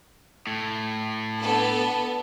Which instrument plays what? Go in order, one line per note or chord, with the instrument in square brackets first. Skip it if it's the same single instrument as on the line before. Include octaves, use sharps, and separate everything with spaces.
[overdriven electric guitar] A2
[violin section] B3 D4 A4